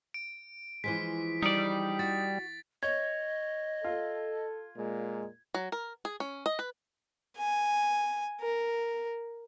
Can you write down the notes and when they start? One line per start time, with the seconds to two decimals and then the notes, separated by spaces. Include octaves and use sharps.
0.14 D7
0.84 E3 F3 G#3 B6
1.42 G3 D#4 D5
1.99 F#4 A6
2.83 C#5 D#5 G#6
3.84 F4 A4
4.77 A#2 G#3
5.54 F#3
5.72 A#4
6.05 G#4
6.20 C#4
6.46 D#5
6.59 B4
7.38 G#5
8.40 A#4